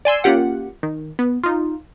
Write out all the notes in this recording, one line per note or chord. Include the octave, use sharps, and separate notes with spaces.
D5 G#5 C6 E6
A#3 C#4 F4 G4 F#5
D#3
B3
D#4 F4